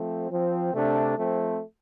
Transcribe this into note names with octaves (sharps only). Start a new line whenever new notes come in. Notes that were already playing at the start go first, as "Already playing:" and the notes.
Already playing: F3 A3 C4
F3 C4
C3 A3 D4
F3 A3 C4